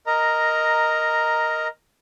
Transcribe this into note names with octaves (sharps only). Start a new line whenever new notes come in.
A#4 D#5 A#5